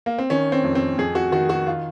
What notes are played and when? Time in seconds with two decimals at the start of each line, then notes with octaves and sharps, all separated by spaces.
0.06 A#3
0.18 C4
0.30 D#3 C#4
0.52 C4
0.64 F2
0.75 C4
0.98 F2 G#4
1.15 F#4
1.32 D#3 F#4
1.50 F#4
1.67 F4